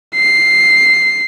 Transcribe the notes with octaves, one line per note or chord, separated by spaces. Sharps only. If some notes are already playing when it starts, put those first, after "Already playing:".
C7